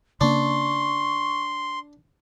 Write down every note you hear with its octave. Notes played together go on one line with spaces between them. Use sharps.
C#3 A#3 D4 C6 C#6